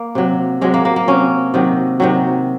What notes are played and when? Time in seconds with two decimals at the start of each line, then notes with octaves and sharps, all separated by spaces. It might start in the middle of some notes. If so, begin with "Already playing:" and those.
Already playing: A#3
0.15 C3 F#3
0.61 C3 F#3 G#3
0.74 A#3
0.85 A#3
0.96 A#3
1.07 C3 F#3 C#4
1.54 C3 D#3 F#3
2.00 C3 D#3 F#3